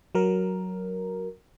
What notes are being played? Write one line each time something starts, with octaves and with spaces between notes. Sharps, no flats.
F#3 A#4